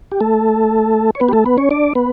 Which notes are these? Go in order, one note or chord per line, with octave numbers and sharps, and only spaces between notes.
G4
A3 A4
C#5
B3 B4
G4
A3 A4
B3 B4
C#4 C#5
D4 D5
B3 B4